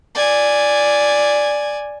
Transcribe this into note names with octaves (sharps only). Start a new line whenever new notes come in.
D5 G#5